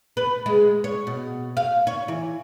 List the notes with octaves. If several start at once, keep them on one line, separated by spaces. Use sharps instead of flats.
B4
G#3
C#5
B2
F5
C#5
E3